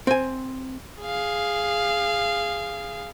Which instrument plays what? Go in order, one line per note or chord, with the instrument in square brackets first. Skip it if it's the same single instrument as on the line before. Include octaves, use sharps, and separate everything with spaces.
[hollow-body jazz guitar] C4 G#5
[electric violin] G#4 F5